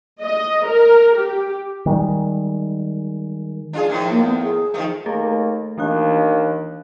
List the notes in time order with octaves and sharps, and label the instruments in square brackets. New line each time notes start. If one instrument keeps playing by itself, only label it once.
[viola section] D#5
A#4
G4
[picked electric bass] D#3 G3 G#3
[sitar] D4 F4 G#4
A2 D#3 F3
[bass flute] A#3
B3
G#4
[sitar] D#3 F3 A3
[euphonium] D#2 [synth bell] A3 G#4 A4
[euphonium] D#2 [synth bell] E3 D4 F#6